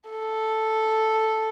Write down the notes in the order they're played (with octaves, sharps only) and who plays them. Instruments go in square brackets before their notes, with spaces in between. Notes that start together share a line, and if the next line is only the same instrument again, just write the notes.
[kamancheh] A4